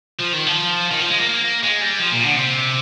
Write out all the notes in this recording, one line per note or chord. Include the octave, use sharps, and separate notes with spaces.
F3
D#3
F3
D#3
F3
G#3
A#3
G#3
G3
F3
A#2
D3
C3